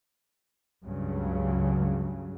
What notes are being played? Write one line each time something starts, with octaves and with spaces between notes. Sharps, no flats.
C#2 G2 C#3 F#3